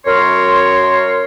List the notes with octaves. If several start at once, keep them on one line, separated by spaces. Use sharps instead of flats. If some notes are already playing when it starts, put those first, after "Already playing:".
F#2 A#4 C#5 C6